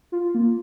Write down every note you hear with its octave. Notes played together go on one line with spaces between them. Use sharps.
F4
A#3